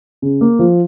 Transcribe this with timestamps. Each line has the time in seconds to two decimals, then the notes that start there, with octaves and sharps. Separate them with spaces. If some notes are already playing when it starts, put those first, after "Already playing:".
0.22 C#3
0.41 A#3
0.59 F3